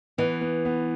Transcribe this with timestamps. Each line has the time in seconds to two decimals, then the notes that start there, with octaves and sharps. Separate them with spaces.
0.18 E3 B3
0.41 B3
0.65 B3